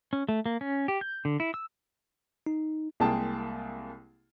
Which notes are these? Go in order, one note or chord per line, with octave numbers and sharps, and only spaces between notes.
C#4
A3
A#3
C#4
G4
G6
D3
E4
E6
D#4
C2 G#3 A#3 G#4 G5 A5